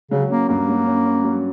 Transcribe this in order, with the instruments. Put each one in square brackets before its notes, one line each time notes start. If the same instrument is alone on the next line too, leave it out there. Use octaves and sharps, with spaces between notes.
[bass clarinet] C#3 [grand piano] F#3
[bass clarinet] A#3 [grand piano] C#4
[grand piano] G2 [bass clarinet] A#3
[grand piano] F#3
C#4
C#4
F#3